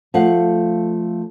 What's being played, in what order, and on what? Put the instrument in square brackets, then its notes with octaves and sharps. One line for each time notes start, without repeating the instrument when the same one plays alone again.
[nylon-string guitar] F3 A3 F5 F#5